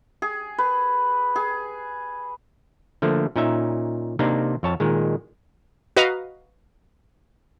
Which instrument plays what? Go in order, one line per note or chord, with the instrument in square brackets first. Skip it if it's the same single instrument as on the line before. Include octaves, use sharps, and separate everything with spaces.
[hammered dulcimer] G#4
B4
G#4
[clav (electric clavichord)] D3 F3 A3 A#3
A#2 C#4 D#4 E5
C3 A#3 D4 D#4
F2 C#5 A5
A#2 D#3 G#3
[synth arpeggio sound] F#4 B4 D#5 F5 A#5